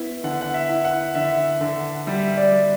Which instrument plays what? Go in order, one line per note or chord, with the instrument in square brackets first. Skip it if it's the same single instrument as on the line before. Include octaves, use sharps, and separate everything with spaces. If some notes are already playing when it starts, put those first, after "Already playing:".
Already playing: [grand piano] B3 E4
D3 F#5
F#5
E5
E4
F#5
D3 E5
D3
G3 E5
D5
G3